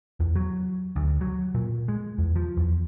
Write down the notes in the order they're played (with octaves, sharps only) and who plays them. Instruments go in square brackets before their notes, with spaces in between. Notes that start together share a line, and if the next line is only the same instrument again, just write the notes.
[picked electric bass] E2
F#3
D2
F#3
A#2
G#3
E2
F3
E2